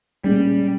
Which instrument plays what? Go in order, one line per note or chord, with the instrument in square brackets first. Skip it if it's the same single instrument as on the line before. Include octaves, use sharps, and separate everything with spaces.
[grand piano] A#2 G#3 C#4 [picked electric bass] G3